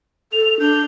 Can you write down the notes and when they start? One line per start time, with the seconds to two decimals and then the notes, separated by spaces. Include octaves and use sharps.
0.33 A4 F7
0.60 D4 G6